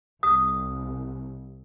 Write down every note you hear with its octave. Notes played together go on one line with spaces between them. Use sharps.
C2 D#6